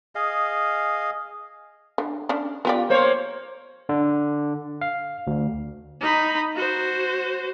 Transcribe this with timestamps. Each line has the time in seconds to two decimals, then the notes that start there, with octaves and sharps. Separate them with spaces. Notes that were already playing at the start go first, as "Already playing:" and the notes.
0.15 G#4 D#5 F5
1.98 D3
2.29 C#4 D4
2.65 B3 F4 G4 D5
2.90 A#3 C5 C#5
3.89 D3
4.81 F5
5.27 D2
6.01 D#4 B5
6.56 F#4 C5